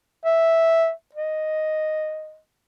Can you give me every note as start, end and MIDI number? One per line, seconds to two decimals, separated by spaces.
0.25 0.90 76
1.15 2.38 75